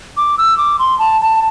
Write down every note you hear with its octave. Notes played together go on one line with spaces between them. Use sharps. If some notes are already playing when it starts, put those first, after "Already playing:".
D6
E6
D6
C6
A5
A5